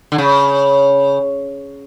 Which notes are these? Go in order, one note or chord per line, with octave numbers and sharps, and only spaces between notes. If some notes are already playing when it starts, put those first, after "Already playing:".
D3
C#3